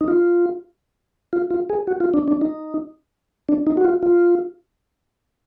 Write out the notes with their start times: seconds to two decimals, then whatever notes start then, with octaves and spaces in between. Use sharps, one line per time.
0.01 D#4
0.08 F4
1.33 F4
1.51 F4
1.70 G#4
1.87 F#4
2.00 F4
2.14 D4
2.28 D4
2.41 D#4
3.49 D4
3.67 D#4
3.77 F#4
3.84 F4
4.03 F4